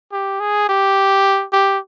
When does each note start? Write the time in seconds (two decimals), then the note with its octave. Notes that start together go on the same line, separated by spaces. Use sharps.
0.12 G4
0.40 G#4
0.69 G4
1.53 G4